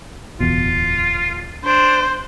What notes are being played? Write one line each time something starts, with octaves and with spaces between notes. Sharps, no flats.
D1 E2 B2 F4
D4 C5